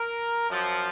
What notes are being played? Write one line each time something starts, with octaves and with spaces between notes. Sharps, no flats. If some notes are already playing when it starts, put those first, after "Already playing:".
Already playing: A#4
F#2 F3